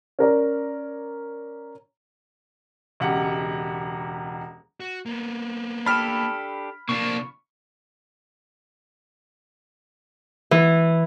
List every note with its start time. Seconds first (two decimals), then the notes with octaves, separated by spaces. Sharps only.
0.19 C#4 A#4 D5
3.00 E1 C#2 G4 F#5
4.80 F#4
5.06 A#3 B3
5.86 D4 G4 A4 B5 F6
6.89 C3 A#3 D4 F4 C#6
10.51 E3